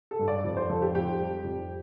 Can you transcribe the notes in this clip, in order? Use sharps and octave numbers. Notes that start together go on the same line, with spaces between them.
A4
G2
D5
F2
C5
F3 A4
G4
F2 G4
G3
F2